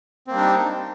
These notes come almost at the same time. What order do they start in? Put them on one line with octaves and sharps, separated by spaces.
C4 A#3 G3 D4 D#4